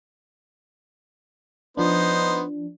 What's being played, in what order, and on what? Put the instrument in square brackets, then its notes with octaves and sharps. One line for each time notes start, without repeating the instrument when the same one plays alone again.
[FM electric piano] F3 D4 [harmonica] B3 D#4 C5